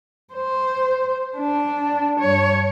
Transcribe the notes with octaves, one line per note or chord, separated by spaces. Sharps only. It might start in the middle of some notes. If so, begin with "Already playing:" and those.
C5
D4
G2 C#5